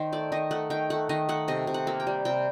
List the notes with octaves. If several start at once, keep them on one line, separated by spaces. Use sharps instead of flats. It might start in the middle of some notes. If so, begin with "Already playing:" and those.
Already playing: D#3 C5
A3 D5
D#3 D#5
A3 F#5
D#3 G5
A3 F#5
D#3 D#5
A3 F#5
C3 D#5
C3
F#5
A#3
G5
G3
C3 G5